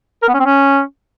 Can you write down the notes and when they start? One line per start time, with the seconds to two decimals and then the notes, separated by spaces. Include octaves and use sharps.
0.23 A#4
0.28 B3
0.34 C#4
0.40 C4
0.45 C#4